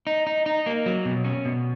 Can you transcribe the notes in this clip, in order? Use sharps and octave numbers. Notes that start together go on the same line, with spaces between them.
D#4
D#4
D#4
A#3
F#3
B2
C#4
B2